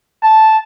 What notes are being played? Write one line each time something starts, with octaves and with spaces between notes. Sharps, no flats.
A5